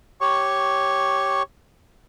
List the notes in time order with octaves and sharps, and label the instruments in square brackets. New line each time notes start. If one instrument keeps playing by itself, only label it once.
[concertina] G4 C#5 C#6